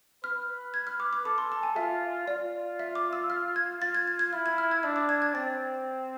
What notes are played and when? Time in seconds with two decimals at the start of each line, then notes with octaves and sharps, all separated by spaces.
0.24 B4 F6
0.74 G#6
0.87 F6
1.00 D6
1.13 D6
1.25 A4 D6
1.38 C6
1.52 A5
1.63 G#5
1.76 F4 E5
2.27 F4 D5
2.79 E5
2.95 D6
3.13 E6
3.30 F6
3.56 G#6
3.81 F4 A6
3.95 G#6
4.07 G#6
4.19 G#6
4.33 E4 F6
4.46 G#6
4.58 F6
4.71 G#6
4.83 D4 E6
4.96 D6
5.09 G#6
5.22 G#6
5.34 C4 A6